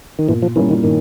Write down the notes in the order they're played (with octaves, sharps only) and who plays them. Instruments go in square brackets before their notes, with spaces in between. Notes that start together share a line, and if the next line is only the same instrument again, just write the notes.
[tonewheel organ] D#3
[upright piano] A#2 [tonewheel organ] E3
[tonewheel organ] F3
[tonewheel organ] E3 [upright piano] G3 A#3 C#4 E4
[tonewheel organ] D#3
[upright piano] A#2 [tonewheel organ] D#3